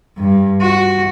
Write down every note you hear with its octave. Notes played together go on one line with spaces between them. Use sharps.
G2
F#4